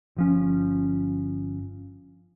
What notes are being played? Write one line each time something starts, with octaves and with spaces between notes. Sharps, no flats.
G1 F3 C#4